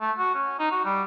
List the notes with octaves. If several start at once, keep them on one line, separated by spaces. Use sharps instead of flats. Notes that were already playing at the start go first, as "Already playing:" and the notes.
A3
F#4
C#4
D#4
F#4
G3